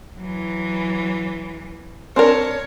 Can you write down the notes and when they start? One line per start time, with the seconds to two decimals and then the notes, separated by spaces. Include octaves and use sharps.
0.18 E3 F#3
2.16 C4 D4 A#4 C#5